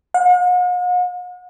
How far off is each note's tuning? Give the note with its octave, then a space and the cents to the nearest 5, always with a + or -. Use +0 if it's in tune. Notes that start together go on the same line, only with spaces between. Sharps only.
F#5 -45